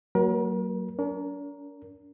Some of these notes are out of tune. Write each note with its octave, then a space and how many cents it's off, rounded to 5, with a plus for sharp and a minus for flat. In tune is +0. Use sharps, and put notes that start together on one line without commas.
F#3 +15 A#3 -25 A#4 +40
D4 -45 A#4 +0